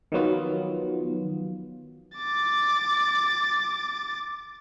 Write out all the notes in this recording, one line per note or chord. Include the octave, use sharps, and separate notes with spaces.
D#3 F3 F#3 B3 F4
D6 A6